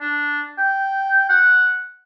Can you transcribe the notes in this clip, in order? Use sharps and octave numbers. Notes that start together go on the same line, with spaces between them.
D4
G5
F#5